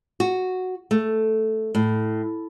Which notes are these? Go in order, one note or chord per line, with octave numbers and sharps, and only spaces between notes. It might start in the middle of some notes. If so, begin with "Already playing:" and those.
F#4
A3
A2